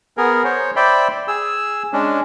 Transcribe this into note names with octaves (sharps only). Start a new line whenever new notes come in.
B3 G#4 A#4
C5 C#5
C5 D5 E5 G5 B5
G#4 E6
G#3 C#4 D4